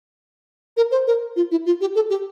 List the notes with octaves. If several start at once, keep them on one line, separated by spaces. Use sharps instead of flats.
A#4
C5
A#4
F4
E4
F4
G4
A4
G4